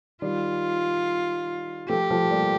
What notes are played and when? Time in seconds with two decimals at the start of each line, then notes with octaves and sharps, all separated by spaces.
0.22 D#3 G3 F4
1.89 F3 A3 G4
2.10 F3 A3
2.31 G3 A#3